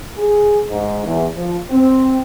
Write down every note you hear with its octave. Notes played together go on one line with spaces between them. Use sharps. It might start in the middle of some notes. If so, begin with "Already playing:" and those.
G#4
G#2
E2
F3
C4